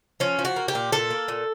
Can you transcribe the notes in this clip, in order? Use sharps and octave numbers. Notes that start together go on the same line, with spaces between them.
F3 C#4
F3
F#4
A#3
G4
A#2
A#2 A4
A#3
A#2